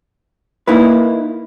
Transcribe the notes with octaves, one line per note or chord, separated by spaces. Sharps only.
A#3 D#4 E4 B4